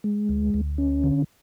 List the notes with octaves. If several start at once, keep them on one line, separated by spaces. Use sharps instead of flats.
G#3
D2
D2
C#4
D3